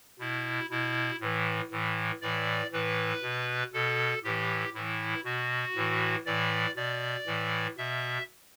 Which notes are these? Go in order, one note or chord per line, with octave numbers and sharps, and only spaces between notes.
B2 E4
B2 E4
A2 E3
A2 E3
A2 E3 D5
A2 E3 B4
B2
B2 A4
A2 E3 G4
A2 E3 E4
B2 F#4
A2 E3
A2 E3 D5
B2 D5
A2 E3
B2 E5